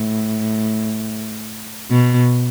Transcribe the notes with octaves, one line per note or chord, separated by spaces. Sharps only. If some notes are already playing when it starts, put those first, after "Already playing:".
Already playing: A2
B2